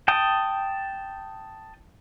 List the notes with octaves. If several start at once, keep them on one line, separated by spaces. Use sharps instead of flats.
G5 A5 D#6